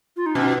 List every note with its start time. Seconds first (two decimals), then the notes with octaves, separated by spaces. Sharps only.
0.17 F4
0.26 D#4
0.35 B2 C#4